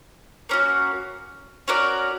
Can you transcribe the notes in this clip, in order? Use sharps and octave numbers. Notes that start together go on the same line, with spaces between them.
A#3 C#4 F#4
C#4 F#4 A#4 D5